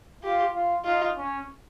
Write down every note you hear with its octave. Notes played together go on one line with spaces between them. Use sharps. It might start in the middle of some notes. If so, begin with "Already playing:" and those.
F4 G4
F4
D#4 F4
C#4